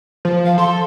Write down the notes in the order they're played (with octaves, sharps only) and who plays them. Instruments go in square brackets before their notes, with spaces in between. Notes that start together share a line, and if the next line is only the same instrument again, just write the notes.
[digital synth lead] F3
[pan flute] F5
[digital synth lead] A4 [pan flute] C6